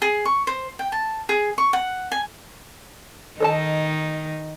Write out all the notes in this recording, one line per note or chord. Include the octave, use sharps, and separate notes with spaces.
G#4
C#6
C5
G5
A5
G#4
C#6
F#5
G#5
D#3 D#4 A4 D#5 A5